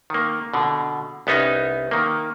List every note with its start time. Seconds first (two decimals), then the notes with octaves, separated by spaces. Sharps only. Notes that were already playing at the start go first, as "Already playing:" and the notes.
0.10 D#3 A#3
0.54 B2 D3
1.27 C2 B3 C#4 D#4
1.91 D#3 A#3